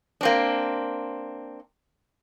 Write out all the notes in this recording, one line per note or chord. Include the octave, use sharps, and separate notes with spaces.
A#3 C4 D4